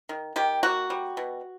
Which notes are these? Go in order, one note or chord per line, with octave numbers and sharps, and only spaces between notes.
D#3
D#3 G4
A#3 F#4
G3
B2